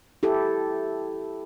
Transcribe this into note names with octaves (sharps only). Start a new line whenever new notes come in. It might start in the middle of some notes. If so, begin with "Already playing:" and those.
E4 G4 A4